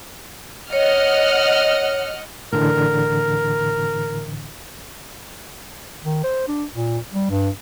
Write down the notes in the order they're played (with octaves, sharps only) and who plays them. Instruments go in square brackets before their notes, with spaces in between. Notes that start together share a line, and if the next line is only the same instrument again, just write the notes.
[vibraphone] C#5 [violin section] D#5 F#5 F6
[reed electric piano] A2 D3 E3 [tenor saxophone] A#4
[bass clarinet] D#3
C5
D4
A#2
G3
G2